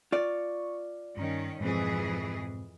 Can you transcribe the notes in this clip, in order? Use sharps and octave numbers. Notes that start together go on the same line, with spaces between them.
F4 D5 C#6
G2 D#3 C#4 A#5
F2 G#2 B2 E3 C4 G#4